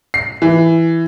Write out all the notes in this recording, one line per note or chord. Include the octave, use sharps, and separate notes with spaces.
C7
E3